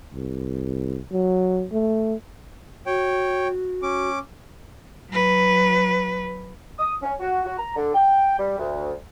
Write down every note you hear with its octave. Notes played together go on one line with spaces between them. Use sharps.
C2
F#3
A3
F#4 C#5 G5
C#4 D6
F#3 B4
D#6
C#4
F#4
F#4
A#5
D3
G5
G3
D2